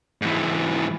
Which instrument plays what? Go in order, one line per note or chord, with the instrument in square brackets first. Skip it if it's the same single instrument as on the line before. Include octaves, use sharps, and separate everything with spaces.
[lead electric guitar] G#2 E3